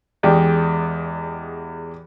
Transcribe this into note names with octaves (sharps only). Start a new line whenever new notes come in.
E2 G#3 G4 D5 G5